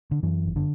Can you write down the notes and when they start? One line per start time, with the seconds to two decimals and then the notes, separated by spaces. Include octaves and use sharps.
0.11 D3
0.23 F#2 E3
0.45 G1
0.56 D3